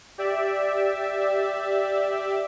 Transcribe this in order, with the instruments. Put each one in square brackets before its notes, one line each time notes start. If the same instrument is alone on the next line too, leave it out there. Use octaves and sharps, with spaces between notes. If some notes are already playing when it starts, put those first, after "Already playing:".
[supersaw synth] G4 D5 E5